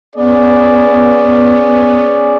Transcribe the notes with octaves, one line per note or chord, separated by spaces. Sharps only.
B3 C#4 G#4 D5